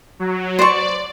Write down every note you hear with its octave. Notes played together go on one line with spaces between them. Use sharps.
F#3
C5 D5 C#6